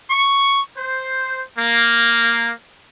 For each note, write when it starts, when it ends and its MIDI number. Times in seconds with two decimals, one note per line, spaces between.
0.11 0.61 85
0.78 1.43 72
1.59 2.52 58